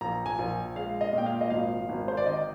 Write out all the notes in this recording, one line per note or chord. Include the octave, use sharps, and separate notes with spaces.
A#1 A#5
G#5
A#1
G#3 F5
D#5
A#2 G5
F5
D#5
G#1 F5
G#1
C5
D5
D#3 D#5